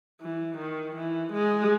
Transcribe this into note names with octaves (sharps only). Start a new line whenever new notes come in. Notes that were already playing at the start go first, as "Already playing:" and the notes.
E3
D#3
E3
G#3